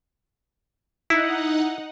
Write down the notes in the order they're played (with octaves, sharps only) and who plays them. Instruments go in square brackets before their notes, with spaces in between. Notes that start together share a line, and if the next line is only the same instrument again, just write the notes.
[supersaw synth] D#4 F#5 [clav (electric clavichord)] E4